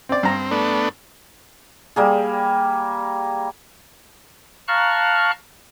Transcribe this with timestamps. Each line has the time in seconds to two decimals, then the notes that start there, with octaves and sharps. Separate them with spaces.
0.09 C4 D5
0.23 G2 C4 A#5
0.51 A3 B3 D4
1.96 G3 A#3 G#4
4.68 F5 A5 A#5 C#6 F6 F#6